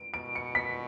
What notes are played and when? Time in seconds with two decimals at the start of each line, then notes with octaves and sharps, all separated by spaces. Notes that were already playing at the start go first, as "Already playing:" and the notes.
Already playing: D7
0.14 B2 D7
0.35 C#7
0.55 B6